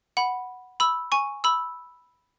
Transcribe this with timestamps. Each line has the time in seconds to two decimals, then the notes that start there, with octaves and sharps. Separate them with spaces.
0.17 F#5 B5
0.80 B5 E6
1.12 G#5 C#6
1.44 B5 E6